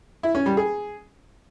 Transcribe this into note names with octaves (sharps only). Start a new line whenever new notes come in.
E4
C#4
G3
G#4